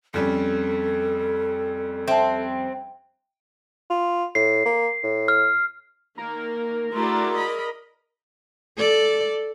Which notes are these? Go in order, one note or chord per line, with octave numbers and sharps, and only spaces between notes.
F2 G3 C#4 A4
C4 E5 A5
F4
A2 C7
A#3
A2
F6
D#3 A#3 A#4
A3 D4 E4 F#4 G#4 D5 A#5 C6
D#5 B5
A4 D5